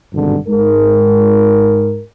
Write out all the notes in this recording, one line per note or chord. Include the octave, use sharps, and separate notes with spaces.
G#1 G2 B2 D3
G#2 A#4